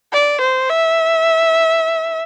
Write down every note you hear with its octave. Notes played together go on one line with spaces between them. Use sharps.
D5
C5
E5